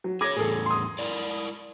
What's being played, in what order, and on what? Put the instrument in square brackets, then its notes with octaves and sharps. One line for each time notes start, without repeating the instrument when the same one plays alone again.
[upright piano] F#3
[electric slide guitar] G#4 C#5 [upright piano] D6 G#6 A#6
[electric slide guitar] E2 A2 [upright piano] G#4 A4
[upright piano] C6 D#6
[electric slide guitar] E4 A#4 D5